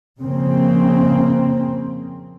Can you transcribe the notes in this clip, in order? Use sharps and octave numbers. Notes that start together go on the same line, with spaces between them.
F2 C#3 A#3 C4